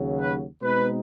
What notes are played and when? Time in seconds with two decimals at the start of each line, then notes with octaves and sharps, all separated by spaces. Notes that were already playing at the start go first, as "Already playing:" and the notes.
Already playing: D#2 C#3 F#3
0.20 B4
0.62 B2 G#3 C4 D#4 B4